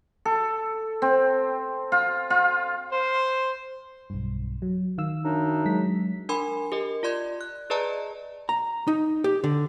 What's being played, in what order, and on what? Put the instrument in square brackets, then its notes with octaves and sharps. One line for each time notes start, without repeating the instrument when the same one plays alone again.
[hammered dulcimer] A4
C4
F4
F4
[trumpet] C5
[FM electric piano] B1 G2
F#3
D#3 F5 E6
[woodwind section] F#2 D4 D#4
[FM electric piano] F#3 G#3 B6
[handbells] D4 A#4 G#5 B5 C6
G4 A#4 D#5
F4 D5 C6 G#6
F#6
G#4 B4 D5 D#5 A5 A#5
[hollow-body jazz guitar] A#5
D#4
G4
D3